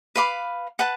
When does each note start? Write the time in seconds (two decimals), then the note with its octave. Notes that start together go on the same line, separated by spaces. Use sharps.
0.16 B4 F5 B5 D6
0.79 B4 F#5 A5